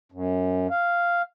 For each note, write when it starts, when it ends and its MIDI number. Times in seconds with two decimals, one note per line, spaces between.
0.12 0.67 42
0.71 1.22 77